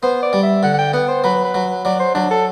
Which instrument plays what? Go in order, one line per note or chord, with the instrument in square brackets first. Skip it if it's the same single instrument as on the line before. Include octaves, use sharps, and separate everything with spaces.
[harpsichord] B3 [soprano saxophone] C5
[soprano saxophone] D5
[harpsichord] G3
[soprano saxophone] E5
[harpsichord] D3 [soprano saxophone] F#5
[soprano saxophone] F#5
G5
[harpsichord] B3 [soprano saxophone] F#5
[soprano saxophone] C5
[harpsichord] F#3 [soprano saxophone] B4
[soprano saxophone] B4
[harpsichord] F#3
[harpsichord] F#3 [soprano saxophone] D5
[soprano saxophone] C5
[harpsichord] F#3 [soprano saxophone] D4
[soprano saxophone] A4